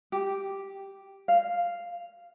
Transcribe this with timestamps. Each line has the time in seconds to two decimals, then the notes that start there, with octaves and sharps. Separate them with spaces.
0.12 G4
1.28 F5